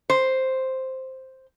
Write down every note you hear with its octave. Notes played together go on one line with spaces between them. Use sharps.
C5